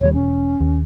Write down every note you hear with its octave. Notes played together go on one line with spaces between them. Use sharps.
E1 D#2 G3 C#5
E1 C#4
D#2